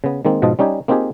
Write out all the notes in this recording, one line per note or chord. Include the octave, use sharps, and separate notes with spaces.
C#3 B3
D#3 G#3 A#3 C4
G#2 B2 F3 F4 D#5 A5
G3 C#4 D#4 G4 G#5
A#3 C4 D#4 F4 G4 G#4